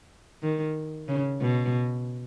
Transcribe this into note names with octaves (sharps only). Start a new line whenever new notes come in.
D#3
C#3
B2